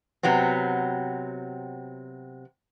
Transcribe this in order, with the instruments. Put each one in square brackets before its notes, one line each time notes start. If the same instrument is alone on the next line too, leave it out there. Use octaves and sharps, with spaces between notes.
[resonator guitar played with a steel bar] C3 F#3 B3 C4